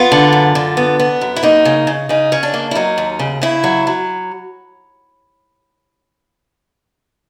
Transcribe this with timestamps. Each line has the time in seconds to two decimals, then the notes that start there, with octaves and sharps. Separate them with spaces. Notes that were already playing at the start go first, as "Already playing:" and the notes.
Already playing: B3 F4
0.12 D3
0.32 F#2
0.55 D3
0.77 B3
1.00 B3
1.21 F#2
1.36 E4
1.43 A#3 D#4
1.65 C#3
1.87 C#3
2.09 C#3 D#4
2.32 C#3 C#4
2.43 D4
2.54 A#3
2.71 E4
2.75 F#3 D#4
2.98 D#2
3.19 C#3
3.42 C#3 E4
3.64 F#3
3.87 F#3